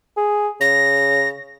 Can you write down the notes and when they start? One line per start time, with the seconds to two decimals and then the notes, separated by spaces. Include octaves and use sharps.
0.17 G#4
0.61 C#3 A#6